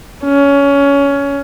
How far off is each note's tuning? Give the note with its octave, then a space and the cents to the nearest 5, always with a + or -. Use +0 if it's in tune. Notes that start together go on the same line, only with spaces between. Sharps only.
C#4 +20